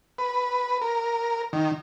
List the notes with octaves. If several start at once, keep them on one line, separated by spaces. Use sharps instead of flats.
B4
A#4
D#3